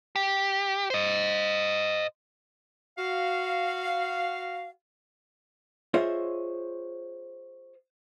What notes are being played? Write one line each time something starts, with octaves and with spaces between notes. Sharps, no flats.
G4
C5 D#5
F#4 F5
F4 G#4 C5 C#5 D#5 E5